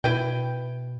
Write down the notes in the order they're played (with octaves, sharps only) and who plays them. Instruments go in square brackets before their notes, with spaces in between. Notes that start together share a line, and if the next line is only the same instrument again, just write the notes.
[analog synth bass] B2 [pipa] E4 B4 G5